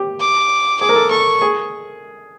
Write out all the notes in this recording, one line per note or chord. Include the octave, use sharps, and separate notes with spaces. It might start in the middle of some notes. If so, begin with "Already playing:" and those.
Already playing: G4
D6
G#4 D6
A#4
A4
A4 C#6
G#4